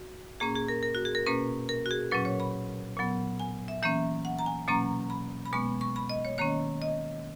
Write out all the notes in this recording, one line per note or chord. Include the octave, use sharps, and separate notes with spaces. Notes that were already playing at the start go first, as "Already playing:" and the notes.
Already playing: F#4
A#2 A#3 C#4 G#4
G#4
A#4
A#4
F#4
G#4
A#4
B2 A#3 C#4 B4
A#4
F#4
G#4
A#2 F#3 C#4 B4
C#5
B5
A#2 F#3 B3
G#5
E5
E3 A#3 C#4 E5
F#5
A#5
G#5
B2 F#3 A#3 C#4 A#5
B5
B5
B2 G#3 B3 C#6
C#6
B5
D#5
C#5
D#3 A#3 C#4 C#5
D#5